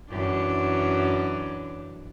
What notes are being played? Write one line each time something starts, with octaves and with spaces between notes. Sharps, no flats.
F#2 E3 D4